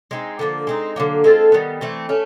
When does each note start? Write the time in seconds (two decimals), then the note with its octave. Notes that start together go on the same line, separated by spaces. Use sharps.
0.11 G#3 C4 D#4
0.39 D3 F3 A#3
0.67 G#3 C4 D#4
0.96 D3 F#3 A#3
1.24 G#3 C4 F4 A4
1.52 D#3 G3 B3
1.81 E3 A3 C4
2.09 A3 C#4